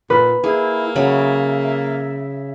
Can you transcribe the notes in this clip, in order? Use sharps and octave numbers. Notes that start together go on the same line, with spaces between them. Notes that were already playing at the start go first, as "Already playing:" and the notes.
A#2 B4
A#3 E4 G#4
C#3 F#3 E5 B5